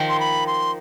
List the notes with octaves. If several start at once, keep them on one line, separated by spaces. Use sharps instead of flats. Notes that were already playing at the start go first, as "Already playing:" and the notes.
Already playing: D#3 F3
C6
B5
C6